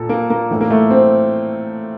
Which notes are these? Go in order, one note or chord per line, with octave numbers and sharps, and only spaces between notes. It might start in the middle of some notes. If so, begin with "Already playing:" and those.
Already playing: A#2 A4
A#3
A#3
A2 E3
A#3
A3
C4